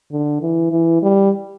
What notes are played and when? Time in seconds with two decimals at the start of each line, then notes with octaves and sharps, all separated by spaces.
0.12 D3
0.41 E3
0.71 E3
1.02 G3